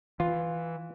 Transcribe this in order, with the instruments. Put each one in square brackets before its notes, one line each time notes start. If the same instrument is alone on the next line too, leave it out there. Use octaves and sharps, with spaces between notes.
[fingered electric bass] E3 [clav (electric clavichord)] F4